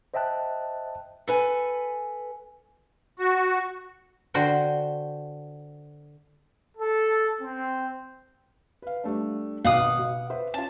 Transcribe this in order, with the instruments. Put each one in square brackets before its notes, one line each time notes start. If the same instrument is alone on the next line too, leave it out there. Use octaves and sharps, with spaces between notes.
[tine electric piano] C5 D#5 E5 G5 A5 F#6
[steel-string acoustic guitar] A4 B4 G#5
[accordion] F#4
[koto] D3 F#4 C5 G5
[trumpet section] A4
C4
[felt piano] B4 F5
G3 A3 D4
[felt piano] G#1 B2 D6 [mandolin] F5 F#5 D#6
[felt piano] B2
B4 C5 E5
[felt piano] C#4 F4 [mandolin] A5